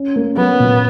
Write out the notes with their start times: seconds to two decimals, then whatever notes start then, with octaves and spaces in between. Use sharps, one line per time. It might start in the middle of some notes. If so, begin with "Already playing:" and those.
Already playing: C#4
0.16 A#3
0.37 F#3 B3
0.60 A#2